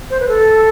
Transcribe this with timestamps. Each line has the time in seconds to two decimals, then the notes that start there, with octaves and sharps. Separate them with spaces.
0.10 C5
0.20 B4
0.28 A4